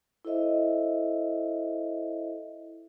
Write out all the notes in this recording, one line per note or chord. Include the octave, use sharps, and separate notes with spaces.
E4 A4 C5 D#5 E5